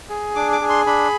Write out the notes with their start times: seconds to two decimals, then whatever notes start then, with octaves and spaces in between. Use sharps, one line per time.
0.10 G#4
0.36 D4 D6
0.52 D6
0.61 G#4
0.69 C6
0.86 D4 B5